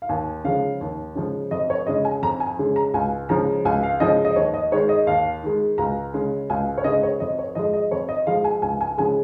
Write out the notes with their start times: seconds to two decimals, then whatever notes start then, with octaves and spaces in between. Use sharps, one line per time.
0.02 F5
0.09 D#2 G#5
0.44 C#3 F3 G#3 F5
0.81 D#2
1.15 C#3 F3 G#3
1.51 F2 D#5
1.70 C#5
1.87 C#3 G#3 D#5
2.05 G#5
2.22 F2 A#5
2.40 G#5
2.59 C#3 G#3
2.76 A#5
2.94 C#2 G#5
3.29 C#3 F3 G#3 A#5
3.65 C#2 G#5
3.83 F5
4.00 C#3 F3 G#3 D#5
4.25 D#5
4.36 D#2 C#5
4.54 D#5
4.72 D#3 G#3 C#5
4.89 D#5
5.07 D#2 F5
5.43 D#3 G#3
5.78 C#2 A#5
6.14 C#3 G#3
6.50 C#2 G#5
6.78 C#5
6.84 C#3 G#3 D#5
7.03 C#5
7.20 F2 D#5
7.39 C#5
7.55 F3 G#3 D#5
7.73 D#5
7.91 F2 C#5
8.09 D#5
8.27 F3 G#3 F5
8.44 G#5
8.62 C#2 G#5
8.81 G#5
8.98 C#3 F3 G#3 G#5